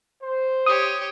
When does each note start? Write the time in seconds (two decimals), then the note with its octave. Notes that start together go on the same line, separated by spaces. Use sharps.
0.22 C5
0.66 G4 C#5 D#6